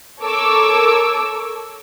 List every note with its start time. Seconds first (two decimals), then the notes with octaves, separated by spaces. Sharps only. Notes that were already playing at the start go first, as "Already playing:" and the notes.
0.21 A4 A#4 C#5 C#6 D6 E6